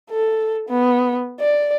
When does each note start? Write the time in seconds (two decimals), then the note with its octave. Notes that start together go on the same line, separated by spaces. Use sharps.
0.11 A4
0.69 B3
1.40 D5